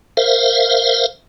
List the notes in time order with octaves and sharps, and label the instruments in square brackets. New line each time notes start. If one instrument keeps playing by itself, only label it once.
[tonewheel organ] A#4 C5 E5 F5